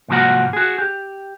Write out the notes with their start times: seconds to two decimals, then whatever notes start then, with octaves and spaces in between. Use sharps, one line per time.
0.08 C2 G#2 F3 A#3 F#4 F#5
0.53 F#4 G#4
0.78 G4